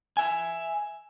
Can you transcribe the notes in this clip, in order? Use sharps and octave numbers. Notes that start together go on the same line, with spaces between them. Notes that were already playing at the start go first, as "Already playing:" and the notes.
E5 G#5